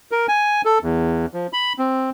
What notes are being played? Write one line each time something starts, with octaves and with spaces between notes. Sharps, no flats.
A#4
G#5
A4
E2
F3
B5
C4